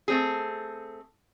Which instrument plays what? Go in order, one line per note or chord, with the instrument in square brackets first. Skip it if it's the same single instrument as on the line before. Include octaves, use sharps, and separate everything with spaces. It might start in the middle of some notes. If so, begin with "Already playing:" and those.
[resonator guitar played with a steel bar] A3 C4 G#4